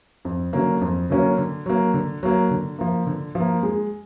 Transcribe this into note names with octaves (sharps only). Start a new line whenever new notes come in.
F2
D3 F#3 A#3 C#4
F2
D3 F#3 A#3 C#4
D3
F#3 A#3
D3
F#3 A#3
D3
F3 A#3
D3
F3 A#3
G#3